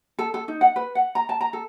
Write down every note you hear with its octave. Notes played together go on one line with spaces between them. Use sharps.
A4
A4
D#4
F#5
B4
F#5
A#5
A5
A#5
A4